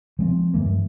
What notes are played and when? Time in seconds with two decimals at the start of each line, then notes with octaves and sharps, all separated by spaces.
0.19 F3 G#3 C4
0.54 G2 E3 G#3 A#3